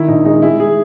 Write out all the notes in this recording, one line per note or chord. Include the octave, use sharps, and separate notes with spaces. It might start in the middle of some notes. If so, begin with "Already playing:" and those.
Already playing: D#3 E4
A#1 D#4
G#3 D#4
G#3 E4
G#4